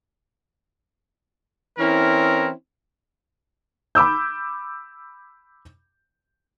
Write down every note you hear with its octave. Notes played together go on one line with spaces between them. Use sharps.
E3 C4 C#4 E4 A#4
B5 D6 E6 G6